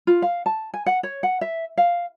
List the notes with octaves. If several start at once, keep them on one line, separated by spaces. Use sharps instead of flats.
F4
F5
A5
G#5
F#5
C#5
F#5
E5
F5